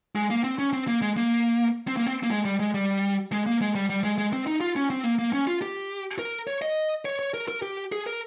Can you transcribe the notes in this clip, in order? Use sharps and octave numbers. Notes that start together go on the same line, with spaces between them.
G#3
A#3
C4
C#4
C4
A#3
G#3
A#3
C4
A#3
C4
A#3
G#3
G3
G#3
G3
G#3
A#3
G#3
G3
G3
G#3
G#3
C4
D#4
F4
C#4
C4
A#3
A#3
C#4
F4
G4
A#4
C#5
D#5
C#5
C#5
A#4
A#4
G4
G#4
A#4